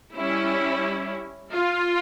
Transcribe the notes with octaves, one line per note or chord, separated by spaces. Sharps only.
G3 C#4 E4
F4